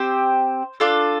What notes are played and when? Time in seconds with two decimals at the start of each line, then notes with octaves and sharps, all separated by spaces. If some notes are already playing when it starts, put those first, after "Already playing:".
Already playing: C4 G4 C5
0.80 D4 F4 A4